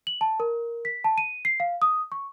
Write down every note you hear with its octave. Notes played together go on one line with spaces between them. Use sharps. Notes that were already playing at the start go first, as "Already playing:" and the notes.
F#7
A5
A#4
B6
A5
D#7
C7
F5
D#6
C#6